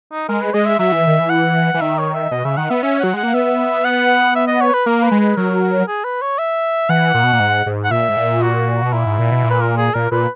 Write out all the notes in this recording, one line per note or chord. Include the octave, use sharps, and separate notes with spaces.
D#4
G#3 A#4
B4
G#3 D#5
E5
F#3 E5
E3
D#3
E3
F#5
E3
D#3 E5
C#5
E5
B2 D#5
C#3 E5
D#3 F#5
B3 E5
C#4 E5
F#3 F#5
G#3 F#5
A#3
B3 E5
F#5
E5
D#5
C#5
B4
A#3 A#4
B4
G#3
B4
F#3 A#4
G#4
B4
C#5
E5
E3 F#5
A#2
B2
A#2
G#2
G#2
F#5
A#2 E5
G#2
A#2
F#4
B2
A#2 E4
G#2
A#2
B2
A#2
B4
A#4
G#4
A#2 A#4
A#2 B4